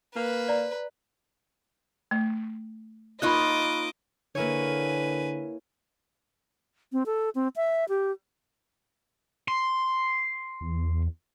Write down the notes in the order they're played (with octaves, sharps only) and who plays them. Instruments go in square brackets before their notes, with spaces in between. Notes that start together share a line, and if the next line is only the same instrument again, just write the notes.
[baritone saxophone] A#3 [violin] B4
[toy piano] D5 A#5
[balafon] A3
[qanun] A#3 D#4 F4 [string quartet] D#5 D6 [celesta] B5 C#6 F#6
[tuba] D3 [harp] A#3 E4 C#5 [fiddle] B4 G#5
[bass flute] C4
A4
C4
E5
G4
[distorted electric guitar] C6
[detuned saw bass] E2